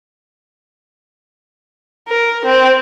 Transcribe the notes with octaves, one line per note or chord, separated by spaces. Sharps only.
A#4
C4